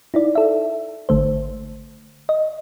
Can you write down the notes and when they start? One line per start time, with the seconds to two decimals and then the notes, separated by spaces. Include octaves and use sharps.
0.14 D#4 E4 D5
0.35 A4 E5
1.09 G#1 D3 A3 C5
2.29 D#5